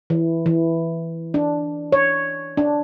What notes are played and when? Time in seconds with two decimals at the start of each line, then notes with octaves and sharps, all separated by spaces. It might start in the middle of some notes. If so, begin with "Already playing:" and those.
0.10 E3
0.46 E3
1.34 D4
1.92 C#5
2.57 D4